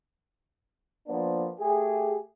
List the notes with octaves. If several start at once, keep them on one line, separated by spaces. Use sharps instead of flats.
F3 A#3 B3 D4
A3 G4 G#4